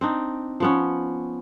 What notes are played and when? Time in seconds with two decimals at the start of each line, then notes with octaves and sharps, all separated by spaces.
0.01 C4 D4 D#4
0.60 F3 B3 C#4